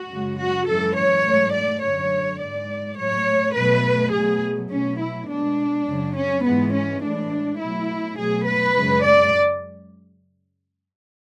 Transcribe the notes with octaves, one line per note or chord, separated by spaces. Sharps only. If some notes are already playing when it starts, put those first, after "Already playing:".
Already playing: F#4
F#2 C#3 G#3
F#4
F#2 E3 G#3 A4
C#5
G#2 F#3 A3
D5
F#2 D3 F#3 C#5
G#2 G#3 D5
A2 F#3 A3 C#5
B2 F#3 A3 B4
B2 F#3 A3 G#4
B2 F#3 A3 C#4
E4
B2 G#3 D4
F#2 C#3 F#3
C#4
G#2 E3 G#3 B3
C#4
A2 E3 G#3 D4
B2 F#3 A3 E4
B2 F#3 A3 G#4
B4
F#2 C#3 G#3
D5